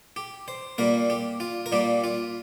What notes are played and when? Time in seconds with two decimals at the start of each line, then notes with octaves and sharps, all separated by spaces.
0.16 G4
0.48 C5
0.78 A#2 G3 A#3 A#4
1.10 G4
1.40 F4
1.66 A#4
1.72 A#2 G3 A#3 G4
2.04 F4